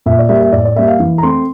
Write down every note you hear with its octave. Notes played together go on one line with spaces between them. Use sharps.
A#2 E5
D5
G3 A#3 E5
E5
A2 D5
D5
G3 A#3 E5
F5
E3
A#5
A3 C4 C6